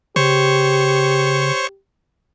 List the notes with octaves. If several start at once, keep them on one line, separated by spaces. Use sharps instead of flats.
C#3 G4 C5 C#5 C#6